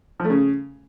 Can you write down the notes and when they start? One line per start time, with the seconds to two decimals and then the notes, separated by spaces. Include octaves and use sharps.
0.20 F3
0.25 A3
0.30 C#3